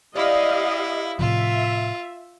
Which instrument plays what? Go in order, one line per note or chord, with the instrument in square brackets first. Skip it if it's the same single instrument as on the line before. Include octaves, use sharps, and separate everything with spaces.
[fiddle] E4 [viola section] G4 D#5 F5 [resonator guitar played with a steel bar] D5
[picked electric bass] A2 C3 F3 [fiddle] F4 [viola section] E5